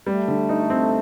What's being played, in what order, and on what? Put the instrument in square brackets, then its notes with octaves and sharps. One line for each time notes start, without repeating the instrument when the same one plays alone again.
[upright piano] G3 [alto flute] A3
[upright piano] D3
D#4
C4